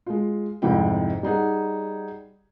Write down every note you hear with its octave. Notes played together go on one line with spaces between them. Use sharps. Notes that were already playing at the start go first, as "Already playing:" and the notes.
G#3 F4
C2 F2 G#2 C3 E4 G5
G3 D#4 G#4 F#5